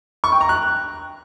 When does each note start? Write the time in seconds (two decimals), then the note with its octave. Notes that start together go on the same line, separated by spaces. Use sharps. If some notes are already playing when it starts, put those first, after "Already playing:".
0.24 C#6
0.32 G5
0.41 A#5
0.49 F#6